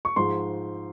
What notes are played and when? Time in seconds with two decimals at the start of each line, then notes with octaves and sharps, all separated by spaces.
0.05 C#6
0.16 G#2 F3 G#3 C6